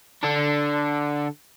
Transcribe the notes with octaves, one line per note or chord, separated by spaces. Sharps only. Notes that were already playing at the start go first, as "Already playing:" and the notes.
D3 D4